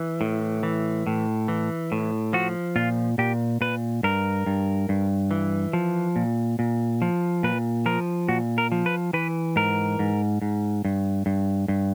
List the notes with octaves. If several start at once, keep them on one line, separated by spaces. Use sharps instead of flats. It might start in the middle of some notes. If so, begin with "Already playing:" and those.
Already playing: E3
A2
E3
A2
E3
A2
F3 F#4
A#2 F4
A#2 G4
A#2 B4
G2 A#4
G2
G2
E3
F3
A#2
A#2
F3
A#2 B4
F3 A#4
A#2 F#4
A#4
F3
B4
E3 B4
G#2 A#4
G#2
G#2
G2
G2
G2